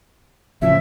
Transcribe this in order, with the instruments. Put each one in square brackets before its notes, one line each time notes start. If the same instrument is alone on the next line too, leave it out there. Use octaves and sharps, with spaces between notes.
[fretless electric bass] A1 C#3 F3 [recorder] E5